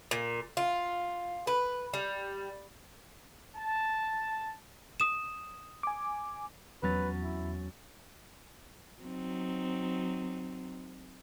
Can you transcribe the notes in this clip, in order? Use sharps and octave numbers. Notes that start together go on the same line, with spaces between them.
A#2
F4
B4
G3
A5
D#6 E7
G#5 D6
E2 F#3 C#4 B4 A6
E4
F#3 C4 D#4